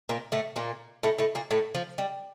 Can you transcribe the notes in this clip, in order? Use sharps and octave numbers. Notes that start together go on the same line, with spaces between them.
A#2 A#3
A2 A3
A#2 A#3
A2 A3
A2 A3
A#2 A#3
A2 A3
F3
G3